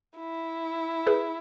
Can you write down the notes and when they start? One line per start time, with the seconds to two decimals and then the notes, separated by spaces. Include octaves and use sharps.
0.17 E4
1.07 G#4 B4